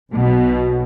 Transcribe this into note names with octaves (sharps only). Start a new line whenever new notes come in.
B1 B2